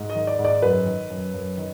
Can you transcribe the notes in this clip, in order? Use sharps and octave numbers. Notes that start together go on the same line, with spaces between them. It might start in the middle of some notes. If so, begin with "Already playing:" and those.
Already playing: G#2
D#5
D#3
D5
G#2
D5
F#2 B4
D#3
F#2
F#2
D#3